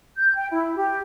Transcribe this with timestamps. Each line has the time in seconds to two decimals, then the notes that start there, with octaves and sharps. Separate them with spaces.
0.17 G6
0.37 G5
0.50 E4
0.76 G4